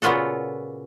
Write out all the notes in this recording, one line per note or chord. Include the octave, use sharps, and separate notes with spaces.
A#2 C#3 B3 F4 F#4 A4